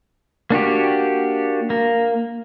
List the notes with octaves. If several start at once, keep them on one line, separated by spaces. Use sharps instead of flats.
A#3 D4 F#4 G4
A#3